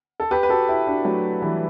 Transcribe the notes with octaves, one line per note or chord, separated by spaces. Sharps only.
A4
G4 B4
B4
F#4 A4
E4 G4
D4 F#4
F#3 A3
E3 G3